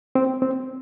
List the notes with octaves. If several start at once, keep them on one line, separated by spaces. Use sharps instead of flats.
C4
C4